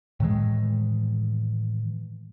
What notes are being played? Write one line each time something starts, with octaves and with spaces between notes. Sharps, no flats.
A2 D#3 E3 G#3